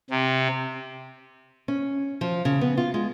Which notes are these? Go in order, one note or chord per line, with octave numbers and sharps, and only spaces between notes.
C3
C#4
F3
C#3
B3
F4
G#3